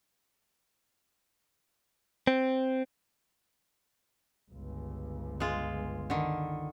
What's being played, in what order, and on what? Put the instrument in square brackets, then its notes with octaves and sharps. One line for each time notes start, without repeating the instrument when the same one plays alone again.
[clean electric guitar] C4
[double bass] G1 C#2
[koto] G#3 F4
D3 D#3